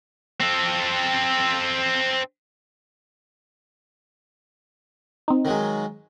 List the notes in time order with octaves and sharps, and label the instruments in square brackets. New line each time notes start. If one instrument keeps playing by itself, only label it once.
[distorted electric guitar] C4 A4
[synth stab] C4 D#4
[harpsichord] D#3 F#3 G#3